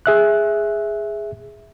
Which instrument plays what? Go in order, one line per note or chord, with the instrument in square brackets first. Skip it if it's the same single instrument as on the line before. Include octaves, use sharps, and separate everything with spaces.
[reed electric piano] G#4 E5 F#6